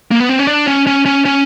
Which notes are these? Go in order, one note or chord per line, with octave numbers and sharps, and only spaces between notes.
A#3
B3
C4
C#4
D4
C#4
C#4
C#4
C#4